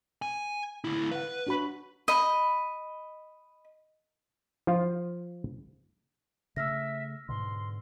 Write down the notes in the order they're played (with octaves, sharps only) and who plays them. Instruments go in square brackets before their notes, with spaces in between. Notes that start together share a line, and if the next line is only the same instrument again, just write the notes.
[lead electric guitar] G#5
D2 E4
[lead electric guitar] B4 [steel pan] F5 F#5
[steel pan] D4 F#4 B5
[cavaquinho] D#5 B5
[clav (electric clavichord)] F3 F4
[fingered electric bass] C#3 A3 [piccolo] E5 [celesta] E6 F6 A#6
[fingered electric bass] G#2 B2 D3 [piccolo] C6